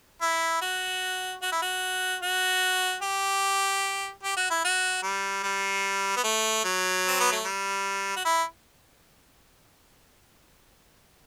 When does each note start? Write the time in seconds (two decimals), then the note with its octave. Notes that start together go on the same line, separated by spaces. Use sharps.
0.21 E4
0.61 F#4
1.42 F#4
1.52 E4
1.62 F#4
2.22 F#4
3.02 G4
4.23 G4
4.37 F#4
4.50 E4
4.64 F#4
5.03 G3
5.43 G3
6.17 B3
6.24 A3
6.64 F#3
7.08 C4
7.20 B3
7.32 A3
7.45 G3
8.16 F#4
8.25 E4